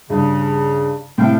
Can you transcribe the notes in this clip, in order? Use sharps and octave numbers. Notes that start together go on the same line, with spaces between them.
G2 C#3
A2 C3 A4 F5 G5